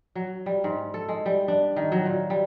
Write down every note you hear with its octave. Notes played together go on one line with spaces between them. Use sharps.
F#3
G3
G#2
A4
G#3
G3
D4
D#3
F#3
A#2
G3